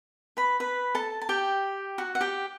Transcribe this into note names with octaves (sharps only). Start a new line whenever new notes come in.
B4 B5
B4 B5
A4 A5
A5
G4 G5
F#4 F#5
F#5
G4 G5